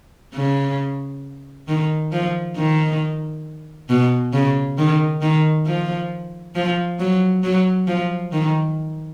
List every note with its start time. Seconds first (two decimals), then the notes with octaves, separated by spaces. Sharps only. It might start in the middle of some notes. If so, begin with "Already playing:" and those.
0.35 C#3
1.68 D#3
2.12 F3
2.56 D#3
3.89 B2
4.33 C#3
4.78 D#3
5.22 D#3
5.66 F3
6.55 F3
6.99 F#3
7.44 F#3
7.87 F3
8.32 D#3